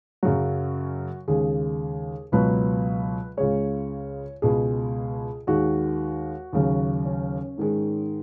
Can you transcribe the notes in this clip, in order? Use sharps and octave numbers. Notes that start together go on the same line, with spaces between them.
F#2 C#3 F#3 F#4
D#2 C#3 G#3 G#4
C#2 B2 F#3 B4
C#2 C#3 G#3 C#5
C#2 B2 G#3 G#4
D#2 D#3 G#3 F#4
D#2 C#3 F#3
C#4
G#2 D#3 G#3